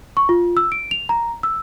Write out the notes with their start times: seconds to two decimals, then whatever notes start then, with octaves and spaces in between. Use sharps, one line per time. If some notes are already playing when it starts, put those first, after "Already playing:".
0.17 C#6
0.29 F4
0.57 E6
0.72 D7
0.91 F7
1.09 A#5
1.43 E6